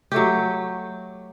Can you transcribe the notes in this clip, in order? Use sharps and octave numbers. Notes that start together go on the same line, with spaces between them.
F#3 A3 G4